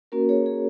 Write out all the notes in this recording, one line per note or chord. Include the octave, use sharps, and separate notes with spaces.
A#3 C#4 F#4 A#4
G#4 C#5
G#4